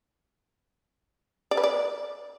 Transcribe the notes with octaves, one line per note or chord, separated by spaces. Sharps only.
D5
B4
D5